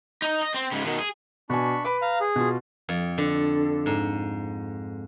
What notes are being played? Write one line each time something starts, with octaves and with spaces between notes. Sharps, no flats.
D#4
D#5
C4
G#2 C#3
B2 D#3
G#4
B2 D4 G#5 B5 C#6
B4 B5 D6
F5 A#5
G#4
B2 F4
F2
D3
G#2